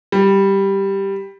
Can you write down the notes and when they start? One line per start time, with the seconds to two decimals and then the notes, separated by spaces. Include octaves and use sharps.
0.12 G3